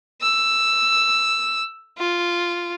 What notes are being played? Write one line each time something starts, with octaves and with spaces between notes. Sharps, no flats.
E6
F4